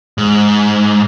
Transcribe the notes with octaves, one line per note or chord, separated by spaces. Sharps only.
G#2